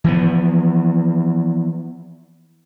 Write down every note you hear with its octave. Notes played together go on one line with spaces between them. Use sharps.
E3 F3 B3